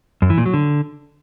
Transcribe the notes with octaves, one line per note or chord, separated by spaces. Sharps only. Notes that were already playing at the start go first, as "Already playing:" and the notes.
F#2
E3
A#2
F#3
D3